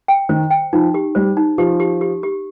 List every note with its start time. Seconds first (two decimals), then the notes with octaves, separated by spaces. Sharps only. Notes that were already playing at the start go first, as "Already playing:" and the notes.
0.08 G5
0.29 D#3 C5
0.50 G5
0.73 F3 D#4
0.94 G4
1.15 G3 C5
1.37 D#4
1.58 F3 G4
1.80 G4
2.01 G4
2.23 G4